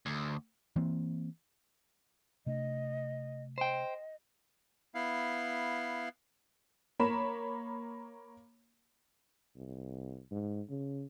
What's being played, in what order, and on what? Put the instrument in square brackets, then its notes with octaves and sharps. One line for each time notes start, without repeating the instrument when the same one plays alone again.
[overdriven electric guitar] D2
[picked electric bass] E3 A#3 C4
[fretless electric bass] C3 A3 D4 [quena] D#5
[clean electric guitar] C5 G5 [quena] D#5
[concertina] B3 E4 F5
[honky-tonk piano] A#3 C#5 A#5 B5 E7
[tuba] C2
G#2
C#3